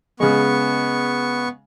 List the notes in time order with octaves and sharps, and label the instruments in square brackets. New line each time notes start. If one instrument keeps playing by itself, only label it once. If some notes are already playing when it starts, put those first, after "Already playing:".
[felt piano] C#3 G#3 [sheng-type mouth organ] B3 C#6